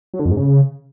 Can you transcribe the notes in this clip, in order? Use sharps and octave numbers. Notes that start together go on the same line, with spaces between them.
F#3
D3
F2
G#2
C#3